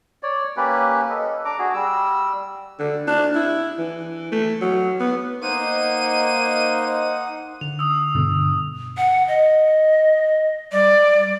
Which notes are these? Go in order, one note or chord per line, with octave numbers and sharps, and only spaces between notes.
C#5 D5
A#3 C#4 G4 B4
A4 D#5
D4 A#5 D6
F#4 G#4
G3 E6
D3
D4
E4
E3
A3
F#3
B3
A#3 D#4 C5 F#5 D#7
D3 F7
D#6 E6
G2 B2 D3
F#5
D#5
G3 D5